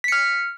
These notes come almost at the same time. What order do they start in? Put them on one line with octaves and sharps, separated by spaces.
B6 C#7 F6